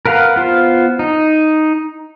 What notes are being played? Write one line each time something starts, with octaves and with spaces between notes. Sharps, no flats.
A#4 B4 F5 F#5
B3 F4 C5
D#4